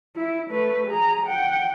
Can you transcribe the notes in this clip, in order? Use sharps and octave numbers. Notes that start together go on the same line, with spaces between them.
E4
A3 B4
G#4 A#5
F#5 G5